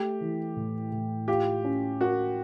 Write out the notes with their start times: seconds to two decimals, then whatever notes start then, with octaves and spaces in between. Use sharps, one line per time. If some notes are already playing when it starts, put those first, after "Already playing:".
Already playing: A3 G4
0.21 E3
0.56 A2
0.92 A2
1.28 F4 G4
1.64 C#4
2.01 F#4 A#4